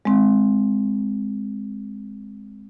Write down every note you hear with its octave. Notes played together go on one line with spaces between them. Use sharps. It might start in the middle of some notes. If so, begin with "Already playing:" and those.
G#3 C4